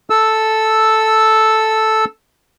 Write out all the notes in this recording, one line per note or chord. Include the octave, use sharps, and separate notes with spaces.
A4 E6